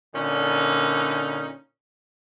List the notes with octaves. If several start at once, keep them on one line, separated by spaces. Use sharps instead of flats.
A#2 D3 C#4 D#4